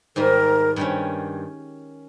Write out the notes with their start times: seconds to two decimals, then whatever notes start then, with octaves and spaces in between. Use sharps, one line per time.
0.16 G#2 D#3 G3 A#4
0.76 G2 D#3 G3 C#4